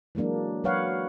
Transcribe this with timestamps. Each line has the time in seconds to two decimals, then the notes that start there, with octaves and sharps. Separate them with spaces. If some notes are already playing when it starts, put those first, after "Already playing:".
0.15 E3 F#3 G#3 A#3 D4
0.64 F#3 B4 C#5 F5 F#5